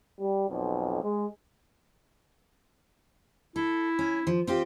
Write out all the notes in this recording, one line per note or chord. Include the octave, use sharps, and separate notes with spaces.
G3
B1 F2
G#3
E4 A4
C#4
F3
C4 F4 G4